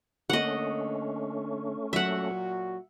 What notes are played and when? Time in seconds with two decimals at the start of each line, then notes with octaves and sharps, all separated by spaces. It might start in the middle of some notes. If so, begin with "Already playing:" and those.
0.30 D3 A3 A#3 C#4 D#5 F#5
1.93 A#2 F#3 F#4 E5 F#5